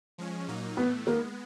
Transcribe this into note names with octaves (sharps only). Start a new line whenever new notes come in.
F3 G#3 C#4
A#2 F#3 A#3 D#4
A2 E3 A3 B3
D#3 G#3 A#3 B3